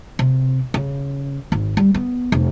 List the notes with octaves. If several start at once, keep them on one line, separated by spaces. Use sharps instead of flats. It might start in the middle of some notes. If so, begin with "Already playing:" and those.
C3
C#3
G#1
G3
B3
F1